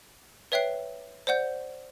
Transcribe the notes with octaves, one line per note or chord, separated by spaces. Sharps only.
B4 C#5 E5 G5 F#6 C7
C5 D5 F#5 G6